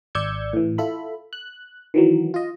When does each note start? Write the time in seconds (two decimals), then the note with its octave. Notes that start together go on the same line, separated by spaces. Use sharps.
0.15 G#1 D5 E6 G6 G#6 C#7
0.53 A2 E3
0.78 E4 F4 A4 B5
1.33 F#6
1.94 D#3 E3 F#3
2.34 F4 D#5